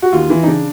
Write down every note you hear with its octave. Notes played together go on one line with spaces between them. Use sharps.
F#4
D#2 F4
E3
D#4
C#3 D4